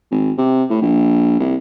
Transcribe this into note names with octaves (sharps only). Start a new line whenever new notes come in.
G#1
C3
A2
A#1
C2